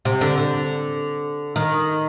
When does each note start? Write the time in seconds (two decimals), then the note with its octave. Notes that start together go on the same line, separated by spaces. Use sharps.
0.05 C3
0.21 D3
0.38 D3
1.56 D#3